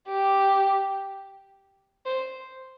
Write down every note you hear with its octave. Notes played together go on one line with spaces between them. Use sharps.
G4
C5